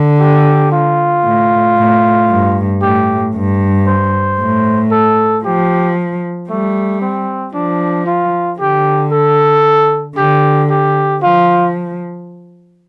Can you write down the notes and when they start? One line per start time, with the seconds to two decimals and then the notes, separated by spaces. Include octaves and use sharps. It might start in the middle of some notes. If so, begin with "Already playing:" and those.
Already playing: D3
0.20 G4
0.72 F4
1.24 A2
1.77 A2
2.29 G2
2.82 A2 G4
3.35 G2
3.87 C5
4.40 A2
4.91 A4
5.44 F3 G4
6.49 G3 A3
7.02 C4
7.54 F3 D4
8.06 F4
8.59 D3 G4
9.12 A4
10.17 D3 G4
10.70 G4
11.22 F3 F4